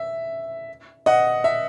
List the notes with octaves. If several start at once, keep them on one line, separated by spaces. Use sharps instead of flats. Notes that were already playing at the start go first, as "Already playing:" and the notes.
Already playing: E5
D#5 F#5
E5